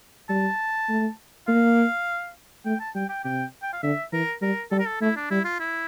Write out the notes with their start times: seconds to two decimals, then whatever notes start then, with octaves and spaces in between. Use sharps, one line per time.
0.29 G3 A5
0.89 A3
1.48 A#3 F5
2.65 A3 G5
2.80 A5
2.95 G3 G5
3.09 G5
3.24 C3 G5
3.62 G5
3.73 F5
3.83 D3 E5
4.13 E3 A#4
4.42 G3 A#4
4.71 G3 A4
4.79 A#4
4.86 A4
5.01 A3 E4
5.16 D4
5.31 G3 E4
5.45 F4
5.60 E4